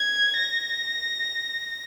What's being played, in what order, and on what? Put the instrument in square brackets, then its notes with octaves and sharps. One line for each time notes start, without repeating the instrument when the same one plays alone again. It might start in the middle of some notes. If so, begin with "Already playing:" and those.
Already playing: [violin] G#6
A#6